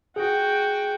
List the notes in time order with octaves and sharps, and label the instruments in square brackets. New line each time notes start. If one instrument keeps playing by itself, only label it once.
[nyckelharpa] F#4 G5 [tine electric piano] G#4